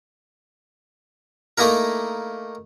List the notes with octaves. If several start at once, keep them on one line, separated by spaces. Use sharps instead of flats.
A3 A#3 D#4 E4 A#4